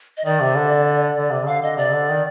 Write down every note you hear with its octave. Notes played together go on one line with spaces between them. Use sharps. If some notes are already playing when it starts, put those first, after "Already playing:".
D#5
D#3 D5
C3
D3
D3
C3
D3 F5
D3 D#5
C3 D5
D3
D#3